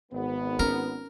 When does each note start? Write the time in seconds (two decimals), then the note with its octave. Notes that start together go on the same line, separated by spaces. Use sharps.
0.12 G#1 B3
0.59 C#4 A#4